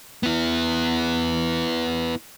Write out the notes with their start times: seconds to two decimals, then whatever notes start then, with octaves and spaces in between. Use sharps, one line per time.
0.23 B3 E4